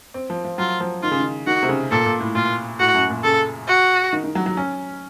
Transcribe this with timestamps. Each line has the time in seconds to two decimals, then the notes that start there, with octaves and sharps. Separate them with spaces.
0.14 C4
0.30 F3
0.44 F3
0.58 F#3 F4
0.80 F3
1.03 D#3 F4
1.11 C#3
1.20 D#3
1.47 D#3 F#4
1.63 C3
1.69 C#3
1.91 A#2 A4
2.06 A#2
2.20 A2
2.35 A#2 F4
2.79 A2 F#4
2.94 F#2
3.10 A#2
3.24 C#3 A4
3.68 F#4
4.13 D#3
4.24 D#3
4.35 F#3
4.46 F#3
4.57 C#4